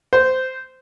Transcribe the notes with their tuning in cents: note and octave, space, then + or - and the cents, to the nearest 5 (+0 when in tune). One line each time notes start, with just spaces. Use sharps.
C5 -15